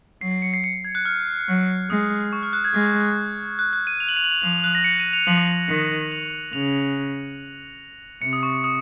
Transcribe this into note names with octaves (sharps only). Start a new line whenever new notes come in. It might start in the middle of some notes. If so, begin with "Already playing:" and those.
F#3 C7
C7
C#7
C7
C#7
C7
G#6
F#6
F6
F#3
G#3 D#6
C#6
F6
F#6
G#6
G#3 F6
F#6
F#6
D#7
F7
F#7
F7
F#7
F7
F3 F7
F7
F#6
A#6
C#7
D#7
F7
F3 F#7
D#3
F7
C#3 F7
C3 C#7
D#6
C#6
D#6